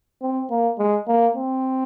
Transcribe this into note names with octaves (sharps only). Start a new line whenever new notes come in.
C4
A#3
G#3
A#3
C4